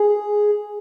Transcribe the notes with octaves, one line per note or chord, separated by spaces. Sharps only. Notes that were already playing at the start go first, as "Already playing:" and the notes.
Already playing: G#4